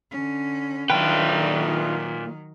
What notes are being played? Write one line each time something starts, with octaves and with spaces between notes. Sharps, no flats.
D3 C#4
A#2 D#3 F#3 D4 F4 B4 G5